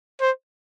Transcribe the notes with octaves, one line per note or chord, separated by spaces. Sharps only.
C5